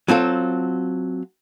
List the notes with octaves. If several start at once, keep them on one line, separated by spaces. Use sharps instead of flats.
F#3 C4 F4 A4